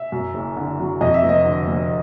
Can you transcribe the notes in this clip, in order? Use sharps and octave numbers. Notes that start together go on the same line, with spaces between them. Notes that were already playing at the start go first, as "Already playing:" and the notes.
Already playing: E5
F#2
F#1
D3
F#3
F2 D#5
E5
F1
D#5
D3
F1